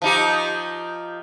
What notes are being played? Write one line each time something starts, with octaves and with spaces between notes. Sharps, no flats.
F3 D#4 G4